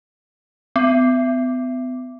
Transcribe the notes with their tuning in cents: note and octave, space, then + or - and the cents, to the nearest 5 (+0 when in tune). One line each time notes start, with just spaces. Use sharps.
B3 +40